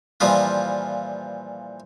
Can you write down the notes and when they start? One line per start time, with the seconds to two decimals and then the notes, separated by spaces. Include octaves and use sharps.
0.20 A#2 E3 F3 G3 F4